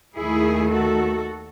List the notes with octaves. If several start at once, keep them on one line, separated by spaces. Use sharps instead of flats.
D#2 D#3 A3 E4 G#4
F#4 A4